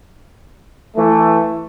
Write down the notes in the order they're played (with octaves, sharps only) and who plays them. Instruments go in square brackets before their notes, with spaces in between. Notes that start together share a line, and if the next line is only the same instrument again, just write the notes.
[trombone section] E3 A3